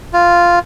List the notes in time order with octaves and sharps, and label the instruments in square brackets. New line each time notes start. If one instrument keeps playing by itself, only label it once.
[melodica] F4